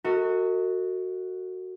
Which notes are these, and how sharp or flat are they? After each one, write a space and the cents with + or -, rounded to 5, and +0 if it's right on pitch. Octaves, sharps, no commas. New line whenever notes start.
F#4 +0 A#4 -45 D#5 +35